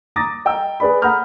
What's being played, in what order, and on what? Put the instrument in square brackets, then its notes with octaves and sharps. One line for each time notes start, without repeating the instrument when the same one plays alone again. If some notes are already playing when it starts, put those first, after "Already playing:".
[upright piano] A#5 D6 D#6 A6 A#6
D#5 G5 A#5 E6
G#4 B4 D5 B5
F#5 A#5 B5 D#6 F6 G6